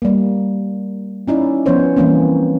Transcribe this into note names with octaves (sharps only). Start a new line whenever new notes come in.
G3 A#3
C#4 D#4 E4 D5
F3 B3 C#4 C5 C#5
E3 G3 A#3 C4 C#4